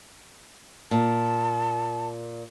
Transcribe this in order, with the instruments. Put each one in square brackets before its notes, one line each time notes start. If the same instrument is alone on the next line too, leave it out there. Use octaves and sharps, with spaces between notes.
[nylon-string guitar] A#2 [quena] A5